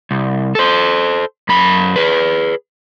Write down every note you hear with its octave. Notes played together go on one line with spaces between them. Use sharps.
C2
A4 C5
F#2 B5
G#4 B4